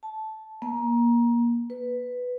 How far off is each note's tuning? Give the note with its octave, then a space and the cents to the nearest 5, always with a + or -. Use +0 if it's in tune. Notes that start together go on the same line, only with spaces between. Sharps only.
A5 -10
A#3 +25
B4 +5